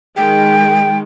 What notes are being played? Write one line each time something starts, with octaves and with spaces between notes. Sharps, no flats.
D#3 G#3 G5